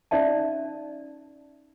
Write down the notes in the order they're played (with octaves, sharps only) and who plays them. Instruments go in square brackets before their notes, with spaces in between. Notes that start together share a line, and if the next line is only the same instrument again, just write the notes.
[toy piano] C#4 D#4 D5 E5 A5